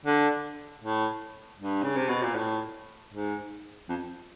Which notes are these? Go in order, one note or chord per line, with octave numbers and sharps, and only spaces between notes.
D3
A2
G2
C#3
C3
B2
A#2
A2
G#2
F2